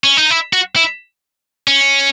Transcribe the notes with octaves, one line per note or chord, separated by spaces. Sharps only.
C#4
D#4
E4
F#4
E4
C#4